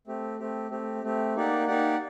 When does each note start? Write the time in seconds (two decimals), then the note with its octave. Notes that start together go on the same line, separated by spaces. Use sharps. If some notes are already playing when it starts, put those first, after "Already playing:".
0.07 A3 C4 G4
0.39 A3 C4 G4
0.71 A3 C4 G4
1.03 A3 C4 G4
1.35 A#3 D#4 G4 D5 F#5
1.67 A#3 D#4 G4 D5 F#5